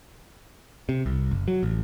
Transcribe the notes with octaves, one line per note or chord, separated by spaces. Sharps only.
C3
C2
F#1
F#3
A1